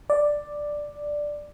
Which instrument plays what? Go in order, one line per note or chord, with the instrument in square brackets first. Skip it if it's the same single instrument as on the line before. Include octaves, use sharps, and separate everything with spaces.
[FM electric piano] D5